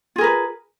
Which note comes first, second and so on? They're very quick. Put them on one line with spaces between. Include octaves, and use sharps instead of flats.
F4 G#4 A#4 B4